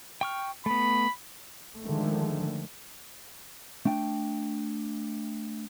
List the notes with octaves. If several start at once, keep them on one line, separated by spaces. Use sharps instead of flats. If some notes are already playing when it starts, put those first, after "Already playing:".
G5 C#6 F6
A3 B3 B5
D3 D#3 F3 G#3 A3
A3 D4 G5